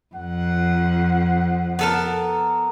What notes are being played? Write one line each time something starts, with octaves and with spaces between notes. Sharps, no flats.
F2 F#5
B3 A4 A#4